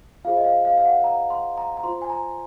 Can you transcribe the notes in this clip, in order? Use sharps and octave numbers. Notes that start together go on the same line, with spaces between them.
F4 G#4 C5 F5
D#5
F5
F5
F5
F#5
A#5
C6
A#5
A#5
F4 C5 C6
G#5
A#5